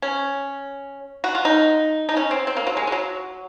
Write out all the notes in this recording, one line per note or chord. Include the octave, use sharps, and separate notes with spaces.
C#4
F#4
F4
D#4
D#4
C#4
C4
C4
A#3
F#3
G#3
G#3
F#3